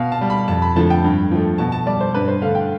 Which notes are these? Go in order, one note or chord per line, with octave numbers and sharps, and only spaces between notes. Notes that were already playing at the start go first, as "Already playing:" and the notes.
Already playing: B2 F5
A5
G3
B5
F2 A5
B5
D3 F3 A3 A5
G5
G2
F3 A3
B2 A5
A5
G3 D5
C5
G2 B4
C5
D3 A3 F5
G5